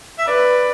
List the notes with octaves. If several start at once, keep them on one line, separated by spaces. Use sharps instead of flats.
E5
B4 D5